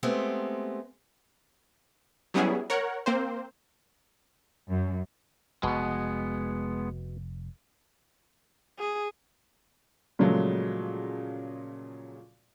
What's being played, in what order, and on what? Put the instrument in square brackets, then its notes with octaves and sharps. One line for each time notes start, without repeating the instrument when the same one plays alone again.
[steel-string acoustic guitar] G#3 A3 B3 C4 G4
[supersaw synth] F#3 G3 B3 C#4 E4 G#4
A#4 C#5 F#5
A#3 C4 C5
[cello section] F#2
[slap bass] F1 [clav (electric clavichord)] B2 [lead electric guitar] G#3 B3
[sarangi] G#4
[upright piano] A#2 C#3 F3 F#3 G#3 A3